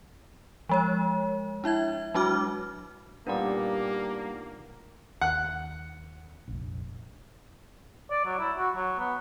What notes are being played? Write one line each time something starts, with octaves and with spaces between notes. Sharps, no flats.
F3 G#3 C#5
D4 E4 E5 G#6
F#3 G#3 D4 F#4 D6 F6
A#2 G3 A#3 B3 D4 D#4 F#5
D#2 F#5
F1 A#1
D5
F#3
E4
F#4
F#3
B3